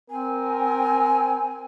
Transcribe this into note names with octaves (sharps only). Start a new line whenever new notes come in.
C4 A#4 G#5